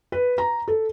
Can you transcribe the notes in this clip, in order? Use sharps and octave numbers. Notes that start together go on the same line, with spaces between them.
B4
A#5
A4